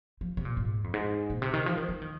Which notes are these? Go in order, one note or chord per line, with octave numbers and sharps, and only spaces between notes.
F3
C3
A#2
G#2
F2
G#2
A#2
C3
D#3
F3
D#3
F3
D#3